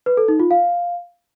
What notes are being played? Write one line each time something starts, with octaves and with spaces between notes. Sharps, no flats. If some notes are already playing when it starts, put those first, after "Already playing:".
B4
A4
D#4
F4
F5